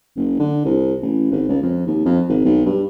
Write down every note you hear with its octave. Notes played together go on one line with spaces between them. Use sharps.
F#1
D3
C2
A1
G#1
C#2
F2
D#2
F2
G#1
B1
G2